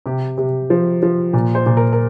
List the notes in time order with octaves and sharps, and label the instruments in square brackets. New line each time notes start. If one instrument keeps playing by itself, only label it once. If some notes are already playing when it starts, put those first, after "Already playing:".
[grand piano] C3 G4
C3
F3
F3
A#2
C5
A#2
A#4
A#4